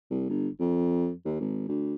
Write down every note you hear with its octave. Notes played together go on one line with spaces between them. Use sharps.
C2
G1
F2
D#2
G#1
D2